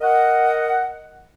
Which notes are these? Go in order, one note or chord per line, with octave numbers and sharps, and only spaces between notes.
A#4 D#5 F#5